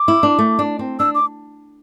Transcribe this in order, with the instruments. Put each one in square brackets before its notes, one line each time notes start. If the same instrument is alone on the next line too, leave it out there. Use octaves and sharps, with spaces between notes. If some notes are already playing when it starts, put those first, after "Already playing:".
Already playing: [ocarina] D6
[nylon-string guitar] E4
D4
A3
D4
C4
[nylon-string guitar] D4 [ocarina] E6
[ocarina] D6